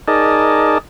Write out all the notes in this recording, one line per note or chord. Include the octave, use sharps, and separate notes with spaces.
D#4 G#4 A#4 D5 D#5 A5